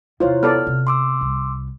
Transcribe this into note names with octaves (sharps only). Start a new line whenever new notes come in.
E2 C3 E4 F4 C5 C#5
B3 A4 D5 F6
C3
C6 D6 E6
C2